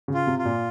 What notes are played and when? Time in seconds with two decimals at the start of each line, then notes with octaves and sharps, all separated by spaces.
0.08 C#3
0.14 F4
0.27 C3
0.39 F4
0.45 A#2